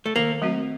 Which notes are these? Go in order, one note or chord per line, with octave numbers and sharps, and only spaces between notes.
A3
D#3 A#3
F#3 A3 C4 F#4